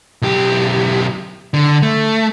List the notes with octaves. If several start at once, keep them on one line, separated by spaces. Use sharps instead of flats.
B1 G4
D3
A3